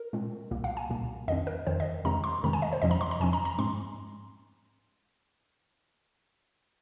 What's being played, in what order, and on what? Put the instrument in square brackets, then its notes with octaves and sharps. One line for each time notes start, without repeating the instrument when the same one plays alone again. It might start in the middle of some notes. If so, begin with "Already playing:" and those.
Already playing: [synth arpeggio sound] A#4
A#2 G#3 C4
C2 A#2 A#3
F5
G#5
C2 A#2 A#3
F2 D#3 C4 D#5
A#4
F2 D#3 C4 C5
D#5
F2 C3 D#3 G#3 C4 A#5
C6
F2 C3 D#3 G#3 C4 A#5
G#5
D#5
C5
F2 C3 F3 C4 D#5
A#5
C6
A#5
F2 C3 F3 C4 G#5
A#5
A#5
G#2 G#3 C4 C6